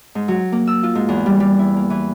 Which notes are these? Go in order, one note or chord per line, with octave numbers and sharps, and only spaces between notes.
G#2
F#3
A#3
E6
F4
G#2
E2
G3
G3
E4
A#3
E3